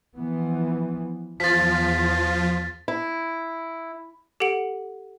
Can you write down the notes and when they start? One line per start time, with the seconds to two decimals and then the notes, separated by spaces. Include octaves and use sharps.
0.17 E3 F3 B3
1.40 E2 F3 F4 A6 B6
2.88 E4
4.40 G4 A4 F#5 D7